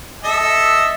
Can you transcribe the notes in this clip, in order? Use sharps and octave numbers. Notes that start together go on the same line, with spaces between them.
A4 D#5 E5